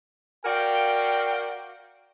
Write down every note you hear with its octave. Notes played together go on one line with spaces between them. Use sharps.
F#4 A#4 D5 F5 G5